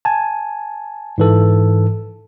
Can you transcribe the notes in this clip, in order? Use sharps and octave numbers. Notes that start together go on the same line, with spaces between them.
G#5 A5
G#2 E3 A4